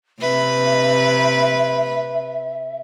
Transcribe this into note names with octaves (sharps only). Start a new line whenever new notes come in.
C3 B4 E5